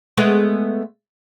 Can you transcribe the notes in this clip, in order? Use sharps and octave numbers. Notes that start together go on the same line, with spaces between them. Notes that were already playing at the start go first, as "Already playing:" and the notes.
G#3 A3 B3